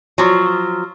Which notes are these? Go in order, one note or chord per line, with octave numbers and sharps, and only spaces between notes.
F3 F#3